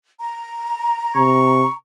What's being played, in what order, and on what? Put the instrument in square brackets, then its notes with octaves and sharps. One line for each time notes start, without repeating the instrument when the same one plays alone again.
[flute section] A#5
[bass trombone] C3 [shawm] C#6